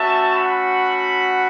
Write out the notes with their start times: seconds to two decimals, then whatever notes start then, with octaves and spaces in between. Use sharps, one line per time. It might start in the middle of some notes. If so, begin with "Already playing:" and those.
Already playing: A3 C#4 F#4 E5 A5
0.34 F#5 B5